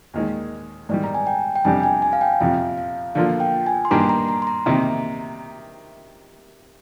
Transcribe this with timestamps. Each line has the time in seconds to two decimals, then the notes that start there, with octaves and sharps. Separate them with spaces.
0.14 D#2 D#3 G#3
0.89 G#2 D#3 G3 D5
1.04 A#5
1.14 G#5
1.27 G5
1.56 G5
1.65 F2 C3 G3 D4 G4 G#5
1.83 G#5
2.02 G#5
2.13 F5
2.21 G5
2.40 F2 C3 F3 F5
2.78 F5
3.15 D3 F3 A#3 F4 F5
3.40 G5
3.66 G#5
3.85 C6
3.91 G2 D#3 A#3 D4 G4 A#5
4.00 C6
4.09 A#5
4.28 A#5
4.42 C6
4.47 A#5
4.66 C3 D#3 A#3 A#5